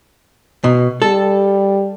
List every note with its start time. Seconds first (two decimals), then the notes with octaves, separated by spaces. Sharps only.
0.64 B2
1.02 G3 A4